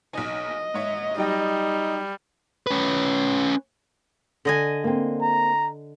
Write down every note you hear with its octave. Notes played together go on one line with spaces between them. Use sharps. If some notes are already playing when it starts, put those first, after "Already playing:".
B1 D#4 D#5 G#5
G#2 C#5 E5
F#3 G3 D#4 G5 A#6
C#4 B4
D3 D#5 G#5
A#3 C4
A#5